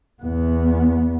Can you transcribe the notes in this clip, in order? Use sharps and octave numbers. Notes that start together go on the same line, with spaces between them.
E2 B3